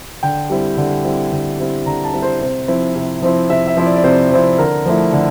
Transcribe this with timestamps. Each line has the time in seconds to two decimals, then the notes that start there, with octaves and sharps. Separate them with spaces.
0.23 D3 G5
0.50 G3 C4 E4
0.77 D3
1.04 G3 C4 E4
1.32 D3 G5
1.59 G3 C4 E4
1.86 D3 A#5
2.05 A5
2.13 G3 C4 E4
2.22 C5
2.41 C3 C5
2.68 F3 C4 E4
2.95 C3
3.22 F3 C4 E4
3.49 C3 E5
3.67 E5
3.77 F3 C4 E4
3.86 D5
3.96 D5
4.04 C3 C5
4.32 F3 C4 E4
4.58 D3 A#4
4.86 F3 A3 E4
5.13 D3